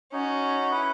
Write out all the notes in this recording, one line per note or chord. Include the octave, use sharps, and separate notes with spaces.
C#4 D#4 F#4 C#5
E4 B4 F#5